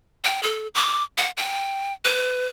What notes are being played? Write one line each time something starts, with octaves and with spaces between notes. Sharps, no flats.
G5
A4
D6
F#5
G5
B4